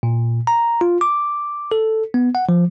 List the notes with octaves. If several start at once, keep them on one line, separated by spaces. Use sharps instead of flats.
A#2
A#5
F4
D6
A4
B3
F#5
F3